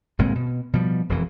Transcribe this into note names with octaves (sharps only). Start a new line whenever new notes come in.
G1 A#2 G#3 C4
B2
B2 F3 G3
E1 F2 E3